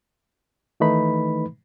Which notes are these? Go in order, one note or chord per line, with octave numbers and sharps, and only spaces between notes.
D#3 E3 A3 D#4 B4 B5